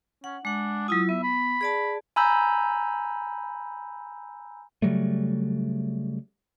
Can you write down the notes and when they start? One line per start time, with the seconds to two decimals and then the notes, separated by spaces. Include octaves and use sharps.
0.24 C#4 F#5
0.45 G#3 D4 F#5
0.88 F#3 E4 F4 D#6
1.09 B3 E5
1.23 B5
1.61 G#4 D5 A5
2.16 G#5 A#5 B5 E6 G6
4.82 C#3 F#3 G3 A3